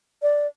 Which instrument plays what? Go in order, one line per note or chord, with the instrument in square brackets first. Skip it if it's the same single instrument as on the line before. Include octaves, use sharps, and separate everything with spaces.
[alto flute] D5